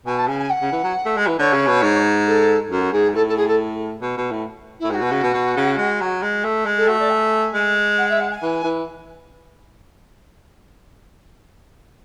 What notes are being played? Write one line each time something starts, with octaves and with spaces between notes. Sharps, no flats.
B2 G#5
A5
C#3 G#5
G#5
F#5
C#3
E3
F#3
A3
G#3
E3
D3 C#5
C#3
B2
G#2
A4
F#2 F#4
F#4
G#2 G#4
A2 A4
A4
G#4
A4
B2
B2
A2
A2 E4
G#2 F#4 G#4
B2
C#3
B2
B2
C#3
G#3
F#3
G#3
A3
G#3
A4
A3 F#4
D5
G#5
G#3
F#5
E5
F#5
G#5
E3
E3